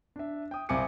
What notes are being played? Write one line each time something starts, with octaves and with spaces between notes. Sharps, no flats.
D4 E5
G5 D#6
C2 C4 F5 G#5 D6 C#7